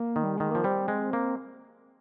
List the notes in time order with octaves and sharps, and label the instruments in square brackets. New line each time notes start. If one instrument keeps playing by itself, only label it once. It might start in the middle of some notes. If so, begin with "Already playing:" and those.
Already playing: [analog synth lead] A#3
[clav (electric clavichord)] D#3
[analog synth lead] G3
[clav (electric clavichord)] D#3 [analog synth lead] G#3
[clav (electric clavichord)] F3 [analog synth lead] A#3
[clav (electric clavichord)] G3 [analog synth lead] C4
[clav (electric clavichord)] G#3
A#3